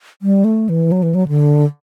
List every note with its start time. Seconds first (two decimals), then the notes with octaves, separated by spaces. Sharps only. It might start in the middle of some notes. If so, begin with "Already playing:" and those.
0.22 G3
0.44 A3
0.69 E3
0.92 F#3
1.03 E3
1.15 F#3
1.28 D3